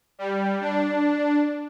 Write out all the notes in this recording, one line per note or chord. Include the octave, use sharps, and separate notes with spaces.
G3
D4